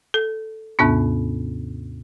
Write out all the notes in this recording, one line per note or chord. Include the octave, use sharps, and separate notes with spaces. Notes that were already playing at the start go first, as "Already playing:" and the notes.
A4
D#2 G#2 C3 B3 D4